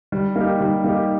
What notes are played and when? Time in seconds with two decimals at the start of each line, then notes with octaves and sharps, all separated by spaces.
0.12 G3
0.36 A#3 D#4 G4
0.61 G3
0.84 A#3 D#4 G4